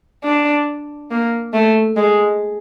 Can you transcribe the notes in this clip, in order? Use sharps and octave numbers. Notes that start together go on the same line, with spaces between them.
D4
A#3
A3
G#3